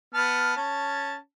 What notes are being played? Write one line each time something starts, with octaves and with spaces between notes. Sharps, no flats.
B3 A5 F6
C#4 A5